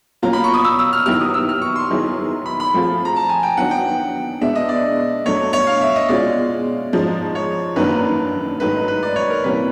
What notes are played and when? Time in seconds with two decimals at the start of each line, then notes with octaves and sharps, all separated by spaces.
0.22 B2 F#3 A#3 C#4 F4 A#5
0.33 B5
0.44 C#6
0.54 D#6
0.64 E6
0.79 E6
0.93 F6
1.06 D#3 F#3 B3 E4 G4 F6
1.20 D#6
1.34 E6
1.49 F6
1.62 C#6
1.76 C6
1.91 D#3 F#3 B3 E4 G#4
2.46 B5
2.60 B5
2.74 F3 A3 C4 F4 G#4
3.05 A#5
3.16 A5
3.29 G#5
3.43 G5
3.57 D#3 F#3 B3 D4 F#4 F#5
3.71 G5
4.41 B2 G#3 B3 D4 E5
4.55 D#5
4.69 D5
5.25 B2 F#3 A3 D4 C#5
5.53 C#5
5.67 F5
5.81 E5
5.96 D#5
6.09 B2 G#3 C#4 F4 D5
6.93 G#2 F3 G#3 C#4
7.35 C#5
7.76 F#2 D#3 F#3 A#3 D4 B4
8.60 G#2 D#3 F#3 A3 B4
8.88 B4
9.03 D5
9.16 C#5
9.30 A#4
9.44 C3 E3 G3 A#3 C#4 B4